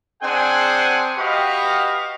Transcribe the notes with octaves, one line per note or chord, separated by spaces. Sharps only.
C4 D4 G#4 C5 F#5 G#5
F#4 G4 B4 D#5 F5 C#6